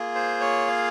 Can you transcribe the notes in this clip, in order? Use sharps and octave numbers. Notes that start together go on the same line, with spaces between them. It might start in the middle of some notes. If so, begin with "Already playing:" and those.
Already playing: A#3 F4 G#4
C5
C#5
F5